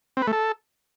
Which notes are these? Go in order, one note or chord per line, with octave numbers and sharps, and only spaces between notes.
C4
B4
A3
A4